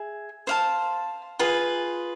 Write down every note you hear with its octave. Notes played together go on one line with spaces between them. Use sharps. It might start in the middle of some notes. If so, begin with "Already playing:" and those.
Already playing: G#4 E5
C5 F5 A5
F4 G#4 B4